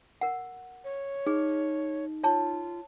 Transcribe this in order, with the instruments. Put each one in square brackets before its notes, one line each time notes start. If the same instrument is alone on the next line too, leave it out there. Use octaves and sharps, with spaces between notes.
[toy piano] A#4 F#5
[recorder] C#5
[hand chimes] D#4 [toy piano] G#4
[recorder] F4 [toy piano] C#5 A5